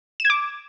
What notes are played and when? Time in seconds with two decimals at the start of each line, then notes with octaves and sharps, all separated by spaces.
0.20 E7
0.25 G#6
0.30 D6